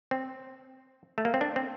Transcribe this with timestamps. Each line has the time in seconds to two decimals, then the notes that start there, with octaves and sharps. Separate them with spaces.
0.11 C4
1.18 A3
1.25 A#3
1.34 C4
1.41 D4
1.56 C4